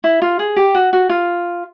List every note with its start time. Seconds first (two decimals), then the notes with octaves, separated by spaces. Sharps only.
0.04 E4
0.22 F4
0.39 G#4
0.56 G4
0.75 F#4
0.93 F#4
1.09 F4